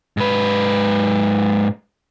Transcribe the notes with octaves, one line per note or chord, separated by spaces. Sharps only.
G#2 B4